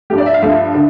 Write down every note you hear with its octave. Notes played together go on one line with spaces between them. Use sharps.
G2 F3 A3 G4
D5
E5
F5
G2 F3 A3 E5
D3